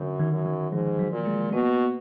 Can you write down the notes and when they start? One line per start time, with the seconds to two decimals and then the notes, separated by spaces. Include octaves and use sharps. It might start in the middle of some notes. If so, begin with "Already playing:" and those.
Already playing: F#2 D3
0.19 D#3
0.32 F#2
0.46 D#3
0.72 G#2 F3
0.99 F#3
1.12 A#2
1.25 G#3
1.52 B2 A#3